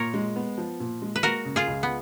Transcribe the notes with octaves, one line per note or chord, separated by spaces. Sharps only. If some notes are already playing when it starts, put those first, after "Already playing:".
Already playing: A#2 A#4 C#5
G#3
B3
F3
A#2
G#3
B4
A#3 F#4 A#4
C#3
F4 G#4
C#2
B3